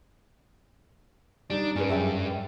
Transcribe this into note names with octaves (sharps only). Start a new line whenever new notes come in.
G3 D4 D#4
G2 C#4 G#4 B4
F#2 E5 G5